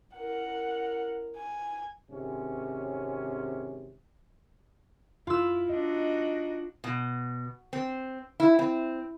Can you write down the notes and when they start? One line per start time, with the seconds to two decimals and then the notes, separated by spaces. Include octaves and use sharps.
0.16 C#4 E4 A#4 F#5
1.37 G#5
2.10 G#1 C3 C#4
5.27 F#2 E4 F4 E6
5.69 D4 D#4 F#4 D#5
6.84 B2
7.73 C4
8.40 E4
8.59 C4